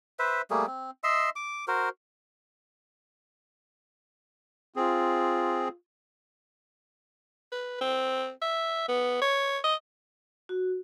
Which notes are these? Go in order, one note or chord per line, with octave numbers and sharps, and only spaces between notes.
B4 C5 E5
G3 A3 A#3 G#4
C4
D#5 E5 C6 E6
D6
F#4 A#4 C5
C4 F4 G#4
B4
C4
E5
B3
C#5
D#5
F#4